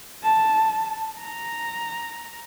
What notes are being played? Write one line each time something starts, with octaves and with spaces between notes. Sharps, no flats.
A5
A#5